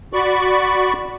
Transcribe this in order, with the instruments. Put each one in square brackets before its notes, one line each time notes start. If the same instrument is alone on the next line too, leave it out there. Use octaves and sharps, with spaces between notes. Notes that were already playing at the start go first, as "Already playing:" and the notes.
[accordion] F#4 D5 B5 C#6